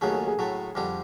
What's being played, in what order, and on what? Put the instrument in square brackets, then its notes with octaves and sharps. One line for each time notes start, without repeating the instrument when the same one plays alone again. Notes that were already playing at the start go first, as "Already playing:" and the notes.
[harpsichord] D#2 C#3 F#3 A3 [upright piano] G#4
[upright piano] A4
G#4
[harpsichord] A2 F#3 A3
F2 D3 G3 C4